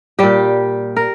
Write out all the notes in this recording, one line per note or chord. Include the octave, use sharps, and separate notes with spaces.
A#2 G3 G4
A#4